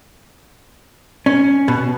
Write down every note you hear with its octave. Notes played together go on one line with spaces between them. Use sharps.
C#4
B2